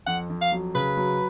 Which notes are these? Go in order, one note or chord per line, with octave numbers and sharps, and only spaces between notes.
F2 F#5
F2
F5
F#3
C#3 B4
F#3